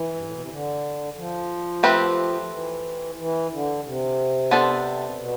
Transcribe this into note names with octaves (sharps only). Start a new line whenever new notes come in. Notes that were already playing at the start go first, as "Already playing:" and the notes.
Already playing: E3
G2
A2
B2
C3
D3
F3
A3 C4 G4 B4
E3
E3
D3
C3
B3 D4 A4 C5
B2